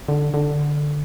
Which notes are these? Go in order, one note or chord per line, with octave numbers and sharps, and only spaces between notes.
D3
D3